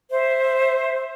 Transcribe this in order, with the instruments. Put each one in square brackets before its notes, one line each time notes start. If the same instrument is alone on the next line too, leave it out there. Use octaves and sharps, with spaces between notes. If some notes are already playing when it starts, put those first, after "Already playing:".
[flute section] C5 E5